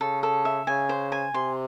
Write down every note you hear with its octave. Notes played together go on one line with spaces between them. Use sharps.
C#3 A4
A4
E5
C#3 G#5
C5
G#5
C3 C6